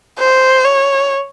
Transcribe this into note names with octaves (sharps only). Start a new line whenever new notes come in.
C5
C#5